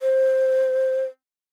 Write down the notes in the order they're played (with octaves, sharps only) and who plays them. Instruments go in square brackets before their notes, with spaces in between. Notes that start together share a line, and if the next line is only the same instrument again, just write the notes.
[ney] C5